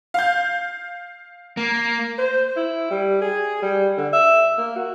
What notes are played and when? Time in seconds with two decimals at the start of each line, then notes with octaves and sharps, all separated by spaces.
0.14 F5 G6
1.57 A#3
2.18 C5
2.56 E4
2.91 G3
3.21 G#4
3.62 G3
3.97 D3
4.13 E5
4.57 A#3
4.76 F#4